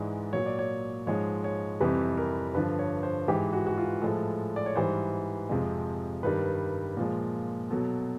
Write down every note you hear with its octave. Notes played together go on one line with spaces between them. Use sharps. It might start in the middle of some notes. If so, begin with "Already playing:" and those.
Already playing: G#2 E3 G#3 D5
A#2 F#3 C#5
D5
C#5
G#2 F3 G#3 C#5
C#5
F2 C3 E3 G3 B4
A#4
G2 D3 F3 B4
C#5
C5
G#2 E3 G#3 G4
F#4
F#4
F4
A2 F3 G#3 A4
D5
C#5
G#2 E3 G3 C5
F2 C3 F3 G#3
G2 D#3 G3 B4
A#2 F3 G#3
B2 F#3 A4